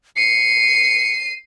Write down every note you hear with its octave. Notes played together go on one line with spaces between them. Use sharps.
C7 C#7 D#7